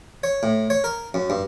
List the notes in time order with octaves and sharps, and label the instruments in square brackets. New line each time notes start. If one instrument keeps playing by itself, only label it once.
[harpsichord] C#5
A2
C#5
A#4
F#2
G2